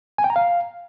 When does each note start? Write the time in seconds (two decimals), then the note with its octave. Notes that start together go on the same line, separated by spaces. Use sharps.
0.18 G#5
0.24 G5
0.30 A#5
0.36 F5